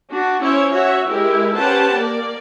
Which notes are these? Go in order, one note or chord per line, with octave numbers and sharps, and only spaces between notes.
D4 F#4
C#4 E4 C5 C#5
F#4 C#5 E5
G#3 E4 G4 A#4
C#4 G4 B4 C5 F#5 A5
A#3 A#4 D5